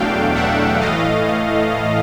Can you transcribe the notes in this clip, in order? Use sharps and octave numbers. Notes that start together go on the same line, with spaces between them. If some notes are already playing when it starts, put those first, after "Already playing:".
Already playing: E2 B2 F#3 A3 D4 F5 G5
E5 F#5
A2 E3 A3 D#5 F5